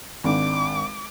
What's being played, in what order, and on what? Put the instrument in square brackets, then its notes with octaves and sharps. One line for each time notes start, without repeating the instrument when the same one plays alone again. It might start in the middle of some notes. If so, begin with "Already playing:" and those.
[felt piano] G#1 D4 [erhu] D6